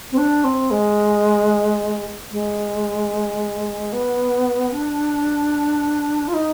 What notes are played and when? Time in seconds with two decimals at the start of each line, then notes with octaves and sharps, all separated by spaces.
0.12 C4
0.18 D4
0.44 C4
0.71 G#3
2.32 G#3
3.93 B3
4.72 D4
6.28 F4
6.34 D#4